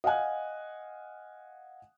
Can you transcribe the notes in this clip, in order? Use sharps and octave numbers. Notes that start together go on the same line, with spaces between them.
D#5 F5 F#5 G#5 F#6